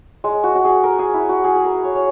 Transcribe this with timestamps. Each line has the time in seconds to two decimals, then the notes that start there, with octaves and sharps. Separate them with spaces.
0.24 G#3
0.44 F#4
0.55 F#4
0.64 G#4
0.84 A#4
0.99 G#4
1.14 E4
1.29 F#4
1.44 G#4
1.55 G#4
1.64 A#4
1.84 C#5
1.95 C#5